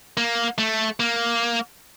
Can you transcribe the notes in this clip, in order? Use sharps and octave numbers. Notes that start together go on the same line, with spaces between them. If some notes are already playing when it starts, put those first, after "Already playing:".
A#3
A3
A#3